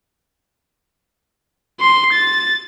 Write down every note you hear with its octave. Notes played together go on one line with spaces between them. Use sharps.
C6
A6